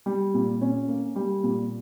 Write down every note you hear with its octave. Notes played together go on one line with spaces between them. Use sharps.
G3
A#2
C#4
A#3
G3
A#2